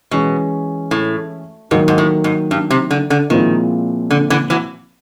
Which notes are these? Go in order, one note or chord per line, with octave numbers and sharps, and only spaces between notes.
B2 E3 G#3 C#4
A2
G#2 D#3 F#3 A#3
G#2
A2
G#2
G2
C3
D3
D3
A#2 D#3 F3 G#3 C4 E4
D3
D3 E3
E3 F#3